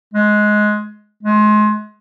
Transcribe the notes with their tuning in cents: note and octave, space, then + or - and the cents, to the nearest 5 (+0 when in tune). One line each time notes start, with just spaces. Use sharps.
G#3 +15
G#3 +30